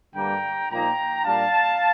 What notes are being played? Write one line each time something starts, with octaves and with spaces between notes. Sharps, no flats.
G2 D3 G3 A#3 D4 G5 A#5
A#2 F3 A#3 D#4 G5 A#5
A#2 G3 D4 F5 A5